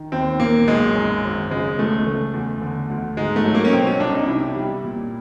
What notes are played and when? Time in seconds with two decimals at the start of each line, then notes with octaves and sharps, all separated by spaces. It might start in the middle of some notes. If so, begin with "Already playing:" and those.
Already playing: D#3
0.12 D#2 C4
0.40 A#2 A#3
0.68 B1 G#3
0.95 F#2
1.24 G#1
1.51 C#3 G#3
1.79 C#2 A3
2.06 C#3 A3
2.34 E2
2.61 D3
2.90 D2
3.17 G#2 G#3
3.36 A3
3.45 F#3
3.55 A#3
3.65 C#4
3.73 B2 C4
3.87 C#4
4.00 C2 D4
4.15 D#4
4.28 C3 E4
4.56 G3
4.84 A#2